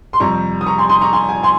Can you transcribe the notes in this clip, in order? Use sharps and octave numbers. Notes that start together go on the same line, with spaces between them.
C6
F2 C3 G3 A#5 C#6
D#6
A#5 C#6
G#5 C6
C6 D#6
A#5 C#6
G#5 C6
G#5
G#5 C6